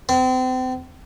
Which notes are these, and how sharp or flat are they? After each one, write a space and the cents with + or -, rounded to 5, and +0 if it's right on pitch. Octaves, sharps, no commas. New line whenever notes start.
C4 -35